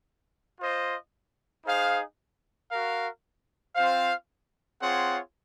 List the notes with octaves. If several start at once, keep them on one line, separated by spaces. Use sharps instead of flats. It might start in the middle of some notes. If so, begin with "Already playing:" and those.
F4 C5 D#5
D#4 G#4 C5 F5
F#4 A#4 F5
C4 F4 C5 F5
C4 F4 G#4 C#5 F#5